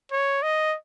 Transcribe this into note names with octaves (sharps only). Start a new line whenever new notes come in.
C#5
D#5